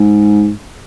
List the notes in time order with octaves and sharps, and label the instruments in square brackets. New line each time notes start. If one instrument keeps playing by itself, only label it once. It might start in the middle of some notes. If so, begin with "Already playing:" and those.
Already playing: [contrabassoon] G#2